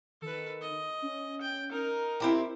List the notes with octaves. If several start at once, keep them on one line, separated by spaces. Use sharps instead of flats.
D#3 A4 B4
D#5
C#4
G5
D#4 A#4
C4 E4 G4 C5